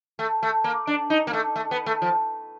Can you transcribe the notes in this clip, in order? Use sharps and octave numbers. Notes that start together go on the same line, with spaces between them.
A3
A3
A#3
D4
D#4
A#3
A3
A3
B3
A3
F3